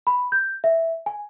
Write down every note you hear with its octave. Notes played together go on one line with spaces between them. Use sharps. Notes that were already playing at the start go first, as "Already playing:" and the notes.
B5
G6
E5
G#5